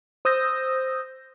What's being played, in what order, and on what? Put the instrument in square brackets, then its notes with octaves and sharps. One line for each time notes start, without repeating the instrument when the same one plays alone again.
[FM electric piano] C5 D#6 E6 G6 A#6